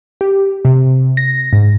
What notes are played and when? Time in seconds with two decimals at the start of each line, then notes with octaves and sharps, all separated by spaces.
0.21 G4
0.65 C3
1.17 A#6
1.53 G#2